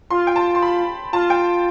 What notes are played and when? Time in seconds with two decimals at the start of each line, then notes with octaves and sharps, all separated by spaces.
0.11 F4 C6
0.27 G5
0.36 A5
0.55 C6
0.62 B5
1.13 F4 A5
1.30 G5